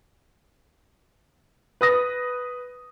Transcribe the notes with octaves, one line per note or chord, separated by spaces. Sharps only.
B4 D#6 A#6